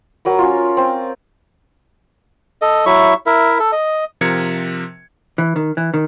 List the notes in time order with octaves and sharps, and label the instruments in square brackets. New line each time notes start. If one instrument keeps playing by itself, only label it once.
[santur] F#3 A#4 B5
C#4 F4
C4
[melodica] A4 D#5
F#3 E4 E5 C#6
E4 A#4 E5
A4
D#5
[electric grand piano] C3 F3 A#4 G#6 C#7
[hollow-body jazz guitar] E3
D#3
E3
D#3